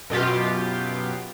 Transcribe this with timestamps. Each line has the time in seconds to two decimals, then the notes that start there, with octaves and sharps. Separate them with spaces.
0.10 F#2 B2 F4 G4